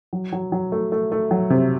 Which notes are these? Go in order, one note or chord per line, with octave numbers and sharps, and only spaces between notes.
F#3
F#3
F#3
A3
A3
A3
F#3
C3